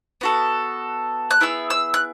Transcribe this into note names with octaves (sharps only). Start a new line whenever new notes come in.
B3 F#4 A4
F#6
B3 E4 G#4 E6
E6
F#6